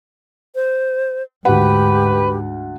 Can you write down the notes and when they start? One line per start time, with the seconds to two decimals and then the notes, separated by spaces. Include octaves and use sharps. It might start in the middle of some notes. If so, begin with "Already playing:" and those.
0.55 C5
1.45 D2 G#2 G4 B4 F#5